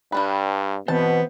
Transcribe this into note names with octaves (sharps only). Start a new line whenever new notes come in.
G2 G3 D4 B4
B2 E3 B3 C4 C5 A5